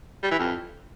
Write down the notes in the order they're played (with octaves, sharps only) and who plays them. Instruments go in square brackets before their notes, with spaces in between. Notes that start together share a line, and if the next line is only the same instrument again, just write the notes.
[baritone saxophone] G3
E3
F2